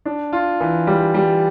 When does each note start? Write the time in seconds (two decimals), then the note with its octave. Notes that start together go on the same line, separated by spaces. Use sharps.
0.05 D4
0.33 F4
0.60 E3
0.87 G3
1.14 G3